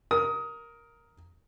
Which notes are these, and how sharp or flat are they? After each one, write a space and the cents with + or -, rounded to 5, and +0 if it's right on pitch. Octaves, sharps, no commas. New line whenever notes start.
A#4 +0 D#6 +20